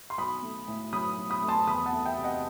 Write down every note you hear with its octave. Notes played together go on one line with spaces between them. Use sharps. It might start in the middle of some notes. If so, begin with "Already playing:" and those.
C6
B1 B5 D#6
A3
A2
F#3 B5 D#6
B1
B5 D#6
A3
A5 C6
E2 B5 D#6
F#5 A5
A3
E5 G5
C3
D#5 F#5